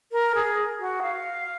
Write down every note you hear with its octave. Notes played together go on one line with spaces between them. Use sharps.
A#4
G#4
F#4
F5